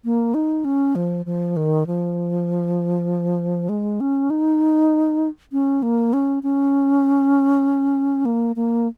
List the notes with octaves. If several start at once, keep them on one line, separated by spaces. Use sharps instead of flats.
A#3
D#4
C#4
F3
F3
D#3
F3
G#3
C#4
D#4
C#4
A#3
C#4
C#4
A#3
A#3